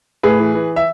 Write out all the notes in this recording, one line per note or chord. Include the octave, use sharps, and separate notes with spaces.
A2 G#4 B4
E3
E3
E5